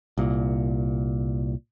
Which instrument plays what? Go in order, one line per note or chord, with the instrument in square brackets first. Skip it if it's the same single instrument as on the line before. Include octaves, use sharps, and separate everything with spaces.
[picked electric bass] C2 A#2